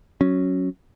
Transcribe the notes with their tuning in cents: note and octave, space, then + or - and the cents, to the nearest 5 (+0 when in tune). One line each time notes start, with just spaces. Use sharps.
F#3 +0 C#4 +0